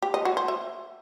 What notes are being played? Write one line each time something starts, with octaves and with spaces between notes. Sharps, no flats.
G4
D#5
F#4
C5
E5